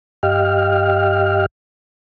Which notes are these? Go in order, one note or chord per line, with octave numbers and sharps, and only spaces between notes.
G2 G4 D#5 F5 G5 F6